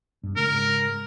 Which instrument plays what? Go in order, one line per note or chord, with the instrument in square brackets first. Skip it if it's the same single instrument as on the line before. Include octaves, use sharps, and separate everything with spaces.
[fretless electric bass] G2
[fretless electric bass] G#2 C#3 G#3 [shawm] A#4